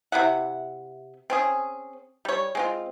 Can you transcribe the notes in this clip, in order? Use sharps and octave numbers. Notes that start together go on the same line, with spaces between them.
C3 E4 E5 F#5
C4 C#4 G#4
G3 C#5
G#3 C4 F4